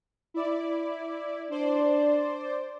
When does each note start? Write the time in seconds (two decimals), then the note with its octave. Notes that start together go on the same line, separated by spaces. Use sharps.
0.34 E4 D5
1.51 D4 C5 D5